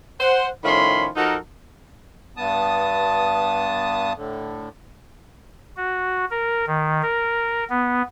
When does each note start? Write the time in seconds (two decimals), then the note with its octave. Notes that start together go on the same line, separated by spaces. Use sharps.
0.20 C5 F#5
0.64 A2 D#3 F3 C#4 B5 C6
1.16 F3 D#4 F#4 A4 A#4
2.37 G2 B3 A5 D#6
4.16 A2 D3
5.77 F#4
6.31 A#4
6.67 D#3
7.02 A#4
7.70 B3